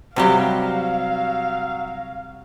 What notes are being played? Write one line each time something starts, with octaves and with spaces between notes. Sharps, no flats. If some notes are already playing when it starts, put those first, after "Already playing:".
C3 F#3 G3 F#4 G4 F5